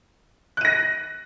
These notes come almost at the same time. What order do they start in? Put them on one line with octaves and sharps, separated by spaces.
F#6 D#7 A#6